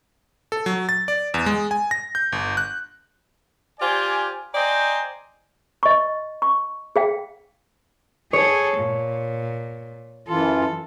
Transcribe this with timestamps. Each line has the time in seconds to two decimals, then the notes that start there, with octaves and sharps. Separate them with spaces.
0.52 A4
0.66 F#3
0.89 A6
1.08 D5
1.34 E2
1.46 G#3
1.71 G#5
1.91 A#6
2.15 G6
2.32 G1
2.57 F#6
3.80 F4 G4 C5 D5 G#5
4.55 C5 D5 D#5 G5 G#5 A#5
5.83 D#5 C#6
6.42 C#6
6.96 G#4 F5 G5
8.33 G#4 A4 C#5
8.78 A#2
10.28 F#2 E3 F4 A4